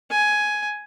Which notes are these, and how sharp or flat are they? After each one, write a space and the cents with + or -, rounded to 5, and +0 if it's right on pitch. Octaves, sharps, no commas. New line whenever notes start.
G#5 +10